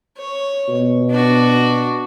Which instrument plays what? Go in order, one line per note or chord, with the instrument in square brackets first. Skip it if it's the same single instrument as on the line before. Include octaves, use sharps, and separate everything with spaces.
[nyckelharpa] C#5
[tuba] B2
[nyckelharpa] D4 F#4